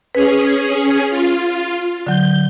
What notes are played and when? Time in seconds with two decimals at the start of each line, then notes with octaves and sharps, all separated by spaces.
0.15 C#4 G#4 B4
1.10 F4
2.07 D3 F#3 G6